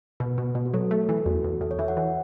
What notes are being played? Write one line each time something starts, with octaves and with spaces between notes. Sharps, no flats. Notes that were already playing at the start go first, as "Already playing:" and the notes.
B2 B4
B2
B2 B4
F#4
F#3 A4
A3 A4
E3
A4
E2 F#4
E2
E2 A4
C#5
E3 E5
F#5
E3